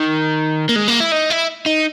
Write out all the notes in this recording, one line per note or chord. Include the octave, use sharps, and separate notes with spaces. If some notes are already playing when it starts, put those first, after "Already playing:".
Already playing: D#3
A#3
G#3
A#3
E4
D#4
E4
D#4